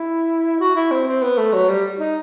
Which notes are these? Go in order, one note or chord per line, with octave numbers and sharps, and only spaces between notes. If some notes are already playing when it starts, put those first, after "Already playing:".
Already playing: E4
F#4
E4
C4
C4
B3
A3
F#3
G3
D#4